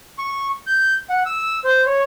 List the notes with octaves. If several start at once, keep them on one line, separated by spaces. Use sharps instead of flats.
C#6
G6
F#5
E6
C5
C#5